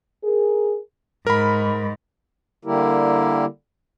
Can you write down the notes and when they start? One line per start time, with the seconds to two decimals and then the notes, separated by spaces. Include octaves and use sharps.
0.24 G#4 A#4
1.27 G#2 A#4 B5
2.65 D3 G3 A#3 E4 G4 A#4